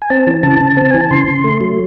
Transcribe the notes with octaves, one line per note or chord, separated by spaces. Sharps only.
G#5
C4 A5
E3
C#3 A5
C#3
C4
E3 G#5
A5
C#3 C6
C#3
A3
F#3